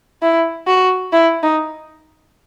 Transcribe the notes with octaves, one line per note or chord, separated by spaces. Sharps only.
E4
F#4
E4
D#4